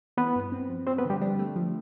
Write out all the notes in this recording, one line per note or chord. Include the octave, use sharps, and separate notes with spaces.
E3 B3 B4
G2
C4
F3
F3 C4 C5
B3 B4
D3
G3 G4
G3 D4 G4
A3
F3